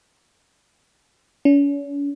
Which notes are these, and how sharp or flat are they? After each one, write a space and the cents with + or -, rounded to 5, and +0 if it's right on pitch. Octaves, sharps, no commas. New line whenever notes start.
C#4 +40